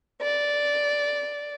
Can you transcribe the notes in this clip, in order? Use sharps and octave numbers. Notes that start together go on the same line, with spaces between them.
D5